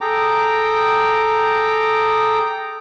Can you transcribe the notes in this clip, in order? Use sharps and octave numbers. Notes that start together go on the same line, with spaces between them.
G#4 A4 G5 A#5 D6